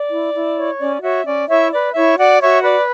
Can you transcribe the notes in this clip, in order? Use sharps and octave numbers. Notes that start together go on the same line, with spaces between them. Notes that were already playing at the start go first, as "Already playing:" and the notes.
Already playing: D5
E4
E4
C#5
C#4 D5
F#4 C#5 E5
C#4 D5
E4 C#5 E5
B4 D5
E4 C#5 E5
F#4 D5 F#5
F#4 C#5 E5
B4 D5